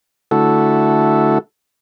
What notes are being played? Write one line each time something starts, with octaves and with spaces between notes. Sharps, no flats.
D3 A3 E4 F#4 A4